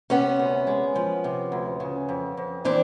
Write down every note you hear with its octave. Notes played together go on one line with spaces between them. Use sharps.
C3 B3 C#4
D2
G#3
F3
C3
D2
C#3
F2
F2
E3 C4 D4